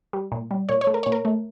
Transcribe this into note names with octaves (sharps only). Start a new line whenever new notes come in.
G3
A#2
G3
A#2 C#5
C#5
A3
A#4
A#2 C#5
A#4
A3